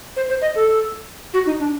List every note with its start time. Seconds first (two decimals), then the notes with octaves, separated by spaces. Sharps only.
0.16 C5
0.29 C5
0.41 D#5
0.55 A4
1.33 F#4
1.46 D#4
1.60 D4